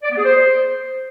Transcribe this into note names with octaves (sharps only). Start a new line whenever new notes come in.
D5
B3
G#4
C5